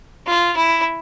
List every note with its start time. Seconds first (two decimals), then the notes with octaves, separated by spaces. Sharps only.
0.27 F4
0.56 E4